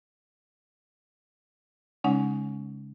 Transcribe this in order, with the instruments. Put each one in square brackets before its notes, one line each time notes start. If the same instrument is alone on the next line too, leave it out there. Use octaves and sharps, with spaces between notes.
[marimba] C#3 G#3 C#4 D#4 F#5